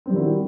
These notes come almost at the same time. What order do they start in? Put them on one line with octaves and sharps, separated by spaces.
C4 G3 D#3 E4 F#4